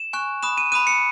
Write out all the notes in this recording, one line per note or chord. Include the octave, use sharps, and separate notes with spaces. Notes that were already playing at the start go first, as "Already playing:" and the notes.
Already playing: E7
G#5 C#6 F#6
B5 D#6 F#6 E7
D#7
B5 D#6 F#6 D#7
C#7